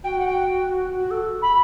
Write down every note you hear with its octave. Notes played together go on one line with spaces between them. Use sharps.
F#4 G5
F#5
G5
F#4
A4
B5